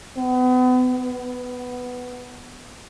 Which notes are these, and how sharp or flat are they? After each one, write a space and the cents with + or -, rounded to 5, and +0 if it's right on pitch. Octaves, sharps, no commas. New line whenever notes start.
B3 +35
B3 +5